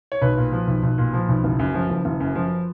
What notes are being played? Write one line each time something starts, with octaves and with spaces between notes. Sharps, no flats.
C#5
B1 B4
A#2
F3
B1
B1
A#2
F3
B1
F#1
F#2
F3
F#1
F#1
F#2
F3